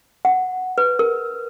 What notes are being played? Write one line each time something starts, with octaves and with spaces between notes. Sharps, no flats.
F#5
B4
A#4